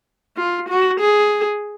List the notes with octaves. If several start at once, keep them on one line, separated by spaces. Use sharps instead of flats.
F4
F#4
G#4